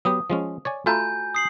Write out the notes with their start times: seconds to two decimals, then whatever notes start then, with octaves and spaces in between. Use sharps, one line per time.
0.05 F#3 B3 G4 D#6
0.30 F3 G#3 C#4
0.65 C#5 D5 G#5
0.86 A3 F4 F#4 A4 G#5 A#5 B5 G6
1.35 D#6 C7 F#7